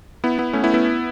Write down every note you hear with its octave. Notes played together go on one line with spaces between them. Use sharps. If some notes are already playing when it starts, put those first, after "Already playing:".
B3 E4
B3 E4
A3 C#4
B3 E4
B3 E4